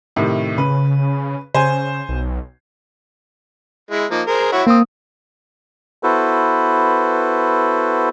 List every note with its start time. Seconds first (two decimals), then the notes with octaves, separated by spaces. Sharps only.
0.16 A2 C3 D#3
0.58 C#3 B4
1.55 C#3 C5 G#5
2.09 B1
3.91 G#3 E4
4.11 F3 A#3 D#4
4.27 G#4 A#4 C5
4.52 E4 F#4 C#5
4.67 A#3 C4 D#6
6.03 B3 E4 F#4 A4 B4 C5